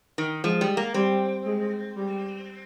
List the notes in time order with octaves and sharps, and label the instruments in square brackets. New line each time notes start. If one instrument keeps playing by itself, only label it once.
[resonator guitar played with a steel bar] D#3
[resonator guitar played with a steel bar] F3 [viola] G#3
[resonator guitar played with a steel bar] G3
A#3
[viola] G3 [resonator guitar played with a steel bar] C4
[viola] G#3
G3